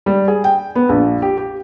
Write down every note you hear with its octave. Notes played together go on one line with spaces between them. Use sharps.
G3
G#4
G5
B3
A#1
G4
G4